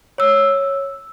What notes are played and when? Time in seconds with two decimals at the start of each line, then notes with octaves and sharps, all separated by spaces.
0.18 C#5 E6